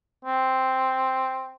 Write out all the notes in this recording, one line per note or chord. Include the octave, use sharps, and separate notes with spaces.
C4